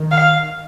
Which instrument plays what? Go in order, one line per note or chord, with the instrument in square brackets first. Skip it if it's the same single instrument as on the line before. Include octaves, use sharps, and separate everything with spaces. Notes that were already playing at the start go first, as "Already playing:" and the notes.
Already playing: [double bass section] D#3
[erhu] F5